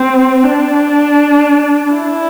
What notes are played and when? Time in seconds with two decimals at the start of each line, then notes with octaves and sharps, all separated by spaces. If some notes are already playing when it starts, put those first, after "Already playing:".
Already playing: C4
0.43 D4
1.92 E4